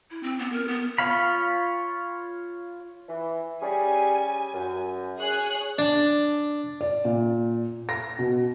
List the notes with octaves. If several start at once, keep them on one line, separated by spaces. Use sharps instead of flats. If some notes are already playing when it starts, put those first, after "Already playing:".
E4
C4
B3
A#4
B3
F4 C#5 F5 B5
E3
G3 C#4 G#4 G#5
F#2
G#4 C#5 F#6
D4
D5
A#2
A#6
B2